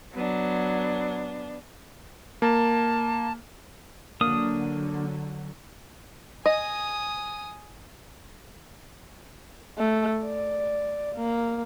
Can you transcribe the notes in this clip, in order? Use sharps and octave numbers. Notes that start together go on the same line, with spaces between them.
F#3 B3 D4
A#3 A5
D3 F#3 A#3 D4 D#6
D#5 G#5 D#6
A3
D5
A#3